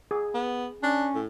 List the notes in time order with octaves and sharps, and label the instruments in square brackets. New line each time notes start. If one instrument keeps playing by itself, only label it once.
[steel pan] G#4
[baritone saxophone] B3
[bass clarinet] C#4 [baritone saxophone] D4
[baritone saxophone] A2